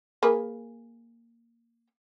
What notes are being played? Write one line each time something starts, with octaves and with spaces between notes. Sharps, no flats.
A#3 G#4 B4